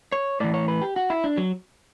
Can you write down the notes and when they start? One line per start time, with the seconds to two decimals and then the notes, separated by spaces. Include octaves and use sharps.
0.12 C#5
0.40 A2 E3 D5
0.54 C#5
0.68 B4
0.82 G4
0.96 F#4
1.10 E4
1.24 D4
1.37 F#3